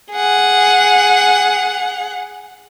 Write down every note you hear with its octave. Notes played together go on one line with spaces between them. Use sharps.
G#4 F#5